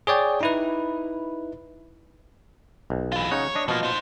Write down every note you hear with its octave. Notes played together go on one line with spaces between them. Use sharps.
G#4 C#5 D5 G5
D#4 E4 B4
B1
E3 F4
C#3 D#4 C#5 F#5
D4 D#5
B2 F3 A#3 F4
D#4 C5